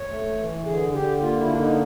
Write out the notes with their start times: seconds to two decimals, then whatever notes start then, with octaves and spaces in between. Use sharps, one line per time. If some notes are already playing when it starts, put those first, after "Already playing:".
Already playing: C#5
0.09 A3
0.38 E3
0.65 D3 G#4
0.94 D3 G4
1.21 A#3 F4
1.40 E4
1.49 D3 D4
1.59 D#4